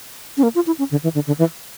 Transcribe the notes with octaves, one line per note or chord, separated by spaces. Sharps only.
C#4
A#3
F4
E4
C#4
D3
E3
D3
D3
E3